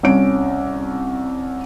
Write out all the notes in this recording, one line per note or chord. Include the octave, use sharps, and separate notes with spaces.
C2 C#4 D7